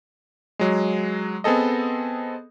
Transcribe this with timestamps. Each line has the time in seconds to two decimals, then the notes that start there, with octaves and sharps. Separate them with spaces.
0.59 F#3 G#3
1.44 B3 C4 G#4 A4 D#5